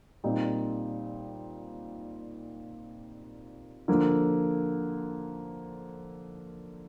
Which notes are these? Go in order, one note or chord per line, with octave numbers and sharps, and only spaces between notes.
A#2 G3 C4 D#4
D3 F3 A#3